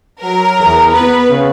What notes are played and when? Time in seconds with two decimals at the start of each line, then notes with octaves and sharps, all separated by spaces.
0.22 F#3 A#4
0.58 E2
0.93 B3 B4
1.29 C#3